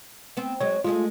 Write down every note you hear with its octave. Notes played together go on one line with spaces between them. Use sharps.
B3 C4
F#3 G#3 C#5
G#3 A3 F4 G#4